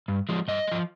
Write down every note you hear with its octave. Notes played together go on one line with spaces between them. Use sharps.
G2
F3 G#3
G2 D#5
G#3
F3